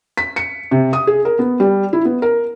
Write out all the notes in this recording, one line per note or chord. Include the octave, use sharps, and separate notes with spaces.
B6
C#7
C3
D#6
G#4
A#4
B3
G3
E4
B3
A#4